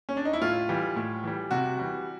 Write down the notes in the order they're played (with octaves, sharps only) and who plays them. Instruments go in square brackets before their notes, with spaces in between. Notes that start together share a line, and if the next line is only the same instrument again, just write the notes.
[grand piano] C#4
D4
D#4
E4
A2 F4
E3 G3
A2
E3 G3
C3 F#4
E3 G3